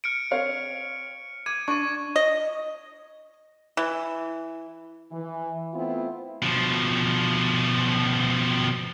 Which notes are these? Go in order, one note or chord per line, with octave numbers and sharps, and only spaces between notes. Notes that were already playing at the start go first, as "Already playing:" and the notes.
F6 C#7 D7
C4 C#5 F5
D6 G#6 D#7
D4 C#6 D#7
D#5
E3
E3
A3 B3 C4 E4 F4
B2 F3